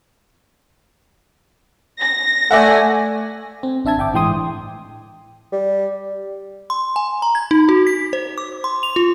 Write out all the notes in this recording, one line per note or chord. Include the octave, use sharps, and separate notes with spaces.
A#6
A3 D5 E5 F#5 G#5
C4
A1 D4 E5 A5 G#6
G1 E5 G5 D6
A2 E3 G#3 G5 C6 D#6
G3
C6
G#5
A#5
G#6
D#4
F#4
B6
C5
D6
C6
F7
F4